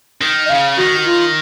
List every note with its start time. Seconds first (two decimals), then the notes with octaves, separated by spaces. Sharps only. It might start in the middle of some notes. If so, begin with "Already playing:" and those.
0.21 D#3
0.45 D#5
0.49 C#3 F5
0.77 D#3 F#4
1.05 F4